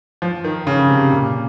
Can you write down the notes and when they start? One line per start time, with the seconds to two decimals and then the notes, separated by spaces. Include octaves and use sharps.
0.22 F3
0.44 D#3
0.67 C#3
0.89 C3
1.12 A#2